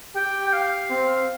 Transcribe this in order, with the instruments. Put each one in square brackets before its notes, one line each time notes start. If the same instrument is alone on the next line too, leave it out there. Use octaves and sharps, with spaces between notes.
[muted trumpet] G4 [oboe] G5
[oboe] G5
F5
[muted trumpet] C4